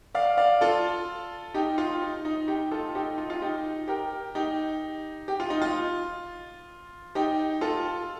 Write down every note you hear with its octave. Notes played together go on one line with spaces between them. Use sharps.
D5 F5
D5 F5
F4 A4
D#4 G4
F4
D#4
D#4
D#4 G4
F4 A4
D#4 G4
F4
F4
D#4 G4
G4 A#4
D#4 G4
G4
F4
D#4
F4
D#4 G4
F4 A4